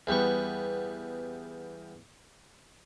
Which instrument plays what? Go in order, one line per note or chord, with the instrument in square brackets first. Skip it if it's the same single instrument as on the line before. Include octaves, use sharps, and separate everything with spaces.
[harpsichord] E2 G3 B3 C#6